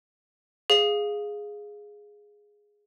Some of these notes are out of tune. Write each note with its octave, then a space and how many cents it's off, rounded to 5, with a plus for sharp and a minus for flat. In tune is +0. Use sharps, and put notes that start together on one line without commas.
G#4 +0 F5 +0